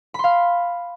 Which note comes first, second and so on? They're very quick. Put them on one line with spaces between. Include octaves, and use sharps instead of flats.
B5 C6 F5